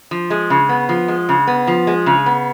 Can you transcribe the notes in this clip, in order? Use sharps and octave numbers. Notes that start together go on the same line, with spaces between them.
F3
G#3
C#3
B3
F3
G#3
C#3
B3
F3
G#3
C#3
B3